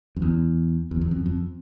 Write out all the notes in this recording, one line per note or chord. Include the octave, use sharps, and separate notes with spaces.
F2
E2
E2
E2
F2
F2